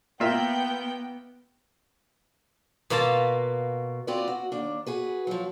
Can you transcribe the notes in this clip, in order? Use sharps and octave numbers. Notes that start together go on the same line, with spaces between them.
A#3 B3 F4 E5 G5
B2 A#3 F4 B4 A5 A#5
C4 F4 F#4 B4 D5
F#4
D#2 D4
F#4 G#4 B4
F3 F#3